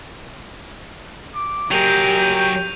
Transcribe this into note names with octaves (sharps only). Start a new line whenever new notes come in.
D6
F#3 G4 G#4 A#4 G5 G6 D#7 F7